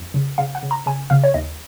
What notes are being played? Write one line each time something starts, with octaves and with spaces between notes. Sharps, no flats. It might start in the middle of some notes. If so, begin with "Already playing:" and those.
Already playing: F2
C#3
C#3 F5
F#5
C#3
A#5
C#3 G#5
C#3 F5
C#5
D#2 D#5